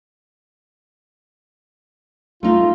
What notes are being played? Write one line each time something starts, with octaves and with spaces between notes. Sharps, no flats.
A3 D#4 F4